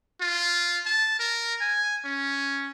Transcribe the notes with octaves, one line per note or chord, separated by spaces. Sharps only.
F4
A5
A#4
G#5
C#4